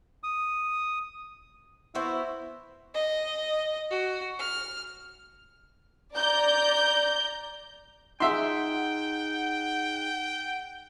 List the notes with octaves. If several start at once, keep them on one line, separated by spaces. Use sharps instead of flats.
D#6
B3 E4 F#4 C5
D#5
F#4
F6
D5 A#5 G6
D#4 G#4 E5 F#5 G5 C6